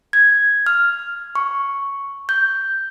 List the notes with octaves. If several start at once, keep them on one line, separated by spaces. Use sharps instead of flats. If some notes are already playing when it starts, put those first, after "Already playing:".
G#6
F6
C#6
G6